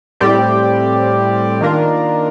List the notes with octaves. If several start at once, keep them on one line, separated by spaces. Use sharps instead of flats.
A2 G3 C4 G4 D5
D#3 A#3 D4 F4 A#4